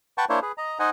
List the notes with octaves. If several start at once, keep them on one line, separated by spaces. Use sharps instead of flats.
B4 F#5 G5 A5 C#6
A#3 D4 E4 C5 C#5
G#4 B4
D#5 A#5
D#4 C5 D#5 F#5 G#5